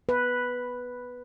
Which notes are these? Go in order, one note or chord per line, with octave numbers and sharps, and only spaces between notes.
B4